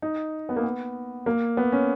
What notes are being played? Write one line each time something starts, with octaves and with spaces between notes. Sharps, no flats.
D#4
B3
A#3
B3
A#3
B3
C#4